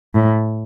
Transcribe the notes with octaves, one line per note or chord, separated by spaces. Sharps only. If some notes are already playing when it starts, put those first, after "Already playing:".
A2